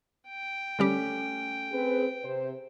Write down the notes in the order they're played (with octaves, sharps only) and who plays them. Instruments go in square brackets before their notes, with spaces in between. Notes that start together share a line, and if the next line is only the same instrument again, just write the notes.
[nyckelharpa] G5
[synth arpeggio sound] D3 G3 G4 [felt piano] A3 C#4
[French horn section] C4 G#4 B4
C3 C5